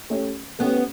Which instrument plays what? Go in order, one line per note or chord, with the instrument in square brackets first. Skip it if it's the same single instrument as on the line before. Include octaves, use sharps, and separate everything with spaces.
[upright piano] A3 C#4 G4 C#5
[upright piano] A3 C#4 G4 C#5 [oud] B3